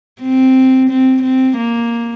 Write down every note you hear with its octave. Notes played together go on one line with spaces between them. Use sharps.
C4
C4
C4
A#3